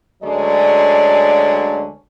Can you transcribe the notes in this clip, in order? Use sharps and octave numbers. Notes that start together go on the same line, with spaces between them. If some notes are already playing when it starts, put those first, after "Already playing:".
D2 D3 F#3 G#3 C#4 D5